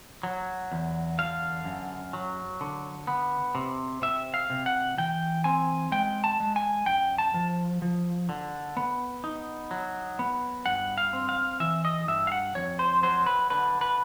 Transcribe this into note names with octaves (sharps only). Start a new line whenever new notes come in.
F#3
E2
D3 F5
F#2
F#3
D3
B3
C3
C3 E5
F5
C3
F#5
E3 G5
C4 G#5
G#3 G5
A5
G#3
G#5
F#2 G5
A5
F3
F3
D3
B3
D#4
F#3
B3
G2 F#5
F5
C4
F5
E3 E5
D#5
G2 E5
F5
F#5
F2 C#5
C5
F#3 C5
B4
D3 B4
B4